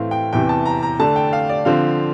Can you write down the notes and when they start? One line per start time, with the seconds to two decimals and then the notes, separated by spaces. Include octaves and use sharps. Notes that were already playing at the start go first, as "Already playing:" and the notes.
Already playing: A2 E3 A3 C4 F5
0.11 G5
0.33 E2 C3 E3 G5
0.49 A5
0.65 A#5
0.83 A#5
0.99 D3 A3 D4 A5
1.16 G5
1.33 F5
1.49 D5
1.65 D3 F3 C4 F5